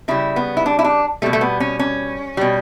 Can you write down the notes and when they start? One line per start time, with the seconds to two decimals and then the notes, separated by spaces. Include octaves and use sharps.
0.08 C#3 G3 E4
0.36 B3
0.57 E4
0.66 D4
0.79 E4
0.85 D4
1.22 B2 G3 A3
1.33 A3
1.41 B3
1.60 C#4
1.79 C#4
2.37 B2 G3